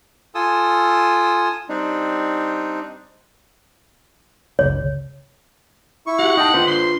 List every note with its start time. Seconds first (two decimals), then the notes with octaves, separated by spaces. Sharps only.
0.35 F4 A4 G#5 D#6 E6
1.69 G3 C4 D4 D#4
4.59 F#1 C#2 C#5
6.07 E4 C#6
6.19 F#4 G4 F#5
6.37 D#4 E4 D#5 G5 A5
6.54 D4 F4 B4 C5
6.68 C6